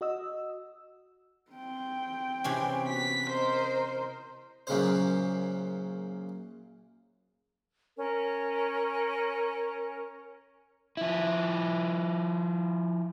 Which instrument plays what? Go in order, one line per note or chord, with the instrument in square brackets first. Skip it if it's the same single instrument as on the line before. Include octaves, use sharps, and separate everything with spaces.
[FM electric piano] F#4 D#5 E6
[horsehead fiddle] C4 G5
[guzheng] C3 E3 C#4
[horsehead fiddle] B3 F#4 [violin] B6
[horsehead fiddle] A#4 D#5 [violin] C5
[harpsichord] F#2 A#2 C#3 C5
[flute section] C#4 A#4
[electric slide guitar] F3 E4